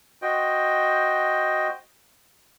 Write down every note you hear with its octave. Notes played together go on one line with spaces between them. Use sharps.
F#4 C5 D#5 G5